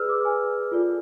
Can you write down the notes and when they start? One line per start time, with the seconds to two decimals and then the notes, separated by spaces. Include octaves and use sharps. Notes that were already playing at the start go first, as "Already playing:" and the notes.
Already playing: G#4 B4 D5 E6 F6
0.09 D6
0.25 G#5
0.72 F4 A4 D5